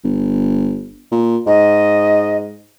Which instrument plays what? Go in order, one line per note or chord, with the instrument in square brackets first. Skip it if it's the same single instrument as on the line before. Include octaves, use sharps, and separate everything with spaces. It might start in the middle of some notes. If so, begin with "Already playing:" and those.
[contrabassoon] G1
A#2
[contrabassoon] G#2 [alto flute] D#5